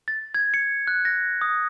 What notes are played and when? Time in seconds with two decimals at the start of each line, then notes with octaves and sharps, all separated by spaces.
0.08 A6
0.35 G#6
0.54 C#7
0.87 F#6
1.05 A#6
1.41 D#6